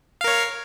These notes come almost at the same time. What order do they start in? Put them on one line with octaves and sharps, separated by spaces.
F5 A#4 C#5